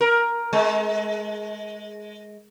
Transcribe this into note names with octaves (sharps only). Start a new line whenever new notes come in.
A#4
G#3